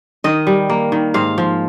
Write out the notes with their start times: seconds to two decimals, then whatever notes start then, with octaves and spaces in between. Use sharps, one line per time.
0.24 D#3 D#5
0.47 G3
0.69 A#3
0.92 D#3
1.14 G#2 F5
1.38 F3